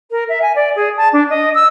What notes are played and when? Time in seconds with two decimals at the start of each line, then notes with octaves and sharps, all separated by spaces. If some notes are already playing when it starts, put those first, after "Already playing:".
0.11 A#4
0.29 E5
0.42 G#5
0.55 D5
0.76 G#4
0.97 A5
1.13 D4
1.30 D#5
1.54 E6